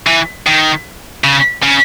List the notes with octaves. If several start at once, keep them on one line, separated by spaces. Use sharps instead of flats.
E3
D#3
C#3
C#3